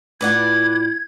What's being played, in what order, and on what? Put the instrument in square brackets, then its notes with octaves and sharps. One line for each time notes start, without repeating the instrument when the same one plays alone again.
[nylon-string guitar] A2 D4 F4 [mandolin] B4 D5 F#5 [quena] G#6